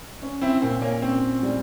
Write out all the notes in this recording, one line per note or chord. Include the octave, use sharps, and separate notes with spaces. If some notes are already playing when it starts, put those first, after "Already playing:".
C#4
C4 E4
A#2 C4
A#3 C#4
C4 C#4
G3